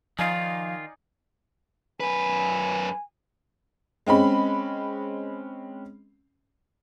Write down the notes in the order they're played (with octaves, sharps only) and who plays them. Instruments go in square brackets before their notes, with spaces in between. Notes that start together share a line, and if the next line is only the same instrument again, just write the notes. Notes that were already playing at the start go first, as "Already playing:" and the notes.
[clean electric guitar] D#3 F4 [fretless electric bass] F3 [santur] D#4 D5 G#5 [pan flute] F5
[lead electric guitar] F#2 B4 [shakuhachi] G#5
[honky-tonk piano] G#3 C4 C#4 B5